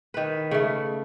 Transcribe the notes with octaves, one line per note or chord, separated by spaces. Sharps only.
D#3 B4
C#3 A3